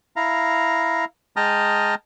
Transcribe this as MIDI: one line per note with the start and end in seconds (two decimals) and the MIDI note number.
0.16 1.05 64
0.16 1.05 77
0.16 1.05 82
1.36 1.95 56
1.36 1.95 79
1.36 1.95 81
1.36 1.95 82
1.36 1.95 87
1.36 1.95 89